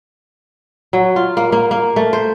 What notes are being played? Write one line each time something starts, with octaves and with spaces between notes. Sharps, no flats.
F#3
F4
A#3
A#3
A#3
A3
C5